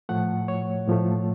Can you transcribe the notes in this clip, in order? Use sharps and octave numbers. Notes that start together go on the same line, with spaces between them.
A2 F3 A3 F#5
C#5
A2 F3 A3